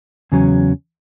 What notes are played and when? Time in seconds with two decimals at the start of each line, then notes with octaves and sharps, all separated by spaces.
0.32 E2 C#3 F#3 C#4